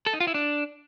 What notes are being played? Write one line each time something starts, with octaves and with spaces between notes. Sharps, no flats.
A4
D#4
F4
E4
D4